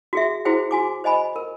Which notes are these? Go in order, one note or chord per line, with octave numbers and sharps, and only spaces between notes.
F#4 G#4 E5
E4 F#4 G#4 C5 G5
F#4 G#5 D6
C5 D#5 G#5 B5
A#4